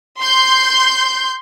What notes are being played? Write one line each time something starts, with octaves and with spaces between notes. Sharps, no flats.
C6 G6